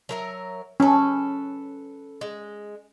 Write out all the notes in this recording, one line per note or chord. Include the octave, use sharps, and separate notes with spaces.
F#3 A#4 E5
C#4 A4 B4
G#3